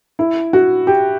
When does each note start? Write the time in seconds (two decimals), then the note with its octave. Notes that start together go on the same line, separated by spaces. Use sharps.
0.19 E4
0.53 F#4
0.87 G4